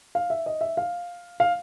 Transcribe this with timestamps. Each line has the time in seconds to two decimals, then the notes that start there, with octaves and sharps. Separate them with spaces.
0.15 F5
0.30 E5
0.46 D#5
0.61 E5
0.77 F5
1.40 F5